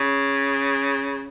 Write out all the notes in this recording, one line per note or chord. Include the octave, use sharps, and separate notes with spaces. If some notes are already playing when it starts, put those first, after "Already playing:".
Already playing: C#3